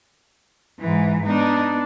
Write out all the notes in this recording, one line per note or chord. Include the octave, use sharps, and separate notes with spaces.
G#2 E3
B3 D4 D#4